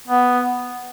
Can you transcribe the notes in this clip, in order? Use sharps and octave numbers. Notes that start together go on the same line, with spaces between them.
B3